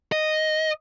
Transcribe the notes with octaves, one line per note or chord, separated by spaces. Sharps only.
D#5